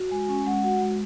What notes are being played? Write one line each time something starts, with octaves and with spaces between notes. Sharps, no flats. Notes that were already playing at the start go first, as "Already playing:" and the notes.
Already playing: F#4
G#3 G#5
C#4 G#5
G#3 F#5
F#4 F#5
G#3